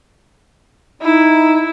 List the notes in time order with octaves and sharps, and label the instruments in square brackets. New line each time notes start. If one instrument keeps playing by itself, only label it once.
[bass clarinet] D#4 [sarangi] E4